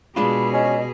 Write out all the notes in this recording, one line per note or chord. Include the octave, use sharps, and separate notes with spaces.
B2 G#3 D4 F4 G#4 B5
C#4 D#5